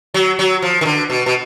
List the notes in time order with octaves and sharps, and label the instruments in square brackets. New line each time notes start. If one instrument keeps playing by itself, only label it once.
[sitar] F#3
F#3
F3
D#3
D3
B2
B2